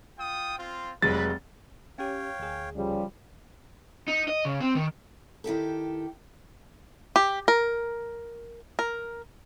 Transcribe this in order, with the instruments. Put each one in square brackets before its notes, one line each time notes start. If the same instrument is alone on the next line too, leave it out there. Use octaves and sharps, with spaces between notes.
[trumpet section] F4 G5 D#6
C4 F4
[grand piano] F1 F#3 G#3 [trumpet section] B4 [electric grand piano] A6
[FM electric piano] C#4 G4 [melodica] C#5 F5 G5
[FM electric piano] D2 G#4
[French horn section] C#3 F3 G3
[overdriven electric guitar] D#4
D#5
C#3
C4
D#3
[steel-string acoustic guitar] D#3 E4 G4 A4
[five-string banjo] G4
A#4
A#4